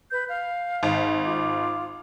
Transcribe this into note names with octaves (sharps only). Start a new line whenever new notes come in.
B4 G6
F5
G#1
F4 D6